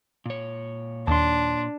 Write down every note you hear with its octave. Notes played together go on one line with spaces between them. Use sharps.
A#2 C#5
D#2 D4 A5 C6